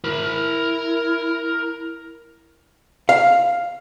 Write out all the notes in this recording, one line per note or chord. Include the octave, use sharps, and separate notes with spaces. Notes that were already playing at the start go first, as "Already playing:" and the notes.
E4 A#4 B5
F5